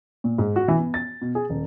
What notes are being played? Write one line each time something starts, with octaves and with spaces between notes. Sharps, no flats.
A#2
G#2
F#4
E3
B3
A6
B2
G#4
D#1